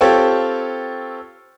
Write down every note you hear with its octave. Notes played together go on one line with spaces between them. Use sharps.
C4 F4 G4 A4 C#5